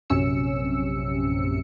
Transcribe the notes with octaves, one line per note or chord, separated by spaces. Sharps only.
A#1 F#2 C3 C#4 E6 C#7